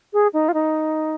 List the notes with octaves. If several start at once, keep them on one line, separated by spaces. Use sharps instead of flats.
G#4
D#4
F4
D#4